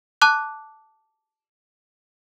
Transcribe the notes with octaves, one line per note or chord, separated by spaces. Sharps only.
A5 D6 F#6